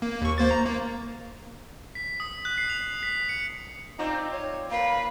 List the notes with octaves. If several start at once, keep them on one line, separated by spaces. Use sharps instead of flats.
A#3
D#2 C#6
A#3 C5 A6
A#5
A#3
B6
D#6
F#6
C7
F7
B6
C#7
C4 D#4 F4 D5
C#5
A#3 B4 F5